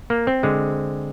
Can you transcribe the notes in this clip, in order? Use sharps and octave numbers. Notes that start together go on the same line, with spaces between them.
A#3
C4
D3 G#3